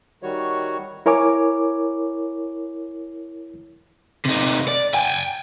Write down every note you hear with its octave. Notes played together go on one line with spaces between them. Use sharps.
D#3 G3 F#4 C#5
E4 A#4 C#5 G#5 D6
C3 D#4
D5
G5 G#5